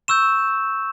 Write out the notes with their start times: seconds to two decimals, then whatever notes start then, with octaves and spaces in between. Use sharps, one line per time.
0.08 C#6 E6 G6 E7